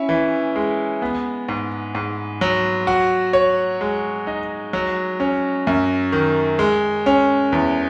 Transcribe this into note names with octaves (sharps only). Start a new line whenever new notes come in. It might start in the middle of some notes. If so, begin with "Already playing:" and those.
Already playing: C#4 E4
E3
G#3
B3
G#2
G#2
F#3
F#4
C#5
G#3
D#4
F#3
C#4
F#2
D#3
G#3
C#4
E2